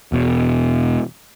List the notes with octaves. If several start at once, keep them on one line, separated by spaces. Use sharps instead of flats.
E1 B2